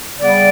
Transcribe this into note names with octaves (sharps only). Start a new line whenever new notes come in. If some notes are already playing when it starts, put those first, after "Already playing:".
C#3 G3 B3 D5